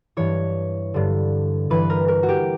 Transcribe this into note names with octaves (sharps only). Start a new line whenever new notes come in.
G2 E3 C#5
G2 D3
G2 E3 B4
A#4
A#4
F#4
G4